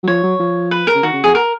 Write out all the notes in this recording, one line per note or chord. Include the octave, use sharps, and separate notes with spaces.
F#3
F3 C#5
F#3
F3
B4
A#4
C#3
D#3 F#4
C#3
F2 G#4
A#4